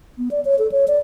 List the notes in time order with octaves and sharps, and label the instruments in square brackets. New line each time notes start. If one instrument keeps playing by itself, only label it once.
[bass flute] B3
D5
C#5
A4
C#5
D5